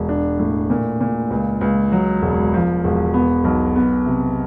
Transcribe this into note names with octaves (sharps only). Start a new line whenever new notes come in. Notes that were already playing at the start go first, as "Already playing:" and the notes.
Already playing: E1
D4
A2
A#2
A#2
C#2
C#2
F#3
E1
F3
E1
B3
B1
B3
C3